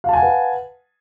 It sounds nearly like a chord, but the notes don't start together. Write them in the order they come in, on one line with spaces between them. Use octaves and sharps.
F5 A5 G#5 F#5 B4